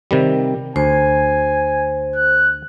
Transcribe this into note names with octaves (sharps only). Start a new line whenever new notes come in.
C3 D#3 G3
D2 C5 G#5
F#6